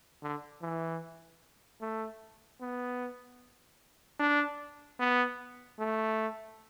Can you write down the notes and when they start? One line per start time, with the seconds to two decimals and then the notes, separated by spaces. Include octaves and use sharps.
0.23 D3
0.62 E3
1.81 A3
2.61 B3
4.19 D4
4.99 B3
5.79 A3